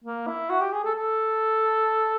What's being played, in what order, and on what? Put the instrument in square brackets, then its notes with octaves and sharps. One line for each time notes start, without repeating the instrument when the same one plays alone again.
[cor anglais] A#3
E4
F#4
G4
G#4
A4
A4